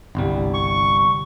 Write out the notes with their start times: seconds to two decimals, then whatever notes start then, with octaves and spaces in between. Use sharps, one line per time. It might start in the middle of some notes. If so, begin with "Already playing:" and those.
0.15 G1 C2 G3
0.54 C#6